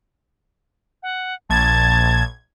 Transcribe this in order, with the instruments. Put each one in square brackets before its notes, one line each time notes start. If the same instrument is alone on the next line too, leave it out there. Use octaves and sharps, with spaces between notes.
[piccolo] F#5
[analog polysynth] A#1 G#6 [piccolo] A5